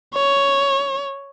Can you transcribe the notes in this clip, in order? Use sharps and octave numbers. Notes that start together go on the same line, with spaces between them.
C#5